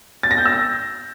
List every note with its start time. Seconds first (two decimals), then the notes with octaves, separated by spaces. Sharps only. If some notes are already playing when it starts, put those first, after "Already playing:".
0.23 A6
0.31 A#6
0.38 G6
0.46 E6
0.53 A#6